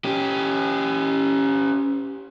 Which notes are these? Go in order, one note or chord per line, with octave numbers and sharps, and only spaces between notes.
C#4 G4